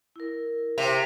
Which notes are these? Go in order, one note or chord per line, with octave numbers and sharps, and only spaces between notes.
E4 A#4
C3 G5